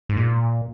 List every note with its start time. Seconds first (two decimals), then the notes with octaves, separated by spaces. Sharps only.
0.09 G#2
0.17 A#2